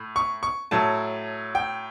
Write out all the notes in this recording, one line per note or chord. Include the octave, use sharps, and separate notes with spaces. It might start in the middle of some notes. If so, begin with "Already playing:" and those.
Already playing: A2
C#6
C#6
A2 F#3 A5
G5